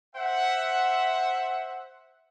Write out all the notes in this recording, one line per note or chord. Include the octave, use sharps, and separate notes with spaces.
C5 E5 F#5